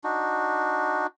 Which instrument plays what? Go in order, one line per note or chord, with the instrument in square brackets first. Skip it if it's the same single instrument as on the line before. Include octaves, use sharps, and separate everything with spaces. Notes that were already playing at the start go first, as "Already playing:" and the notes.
[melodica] D4 D#4 F#4